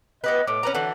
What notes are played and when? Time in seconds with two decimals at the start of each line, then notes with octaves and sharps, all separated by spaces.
0.24 B3 G4 B4 D#5
0.47 A2 D6
0.63 C#4 B4 A#5
0.74 D3 E3 F#4 F#5